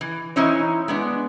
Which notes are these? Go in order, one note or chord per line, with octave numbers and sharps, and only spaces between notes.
E3
E3 C#4 D#4 E4 C5 C#5
G#3 B3 D4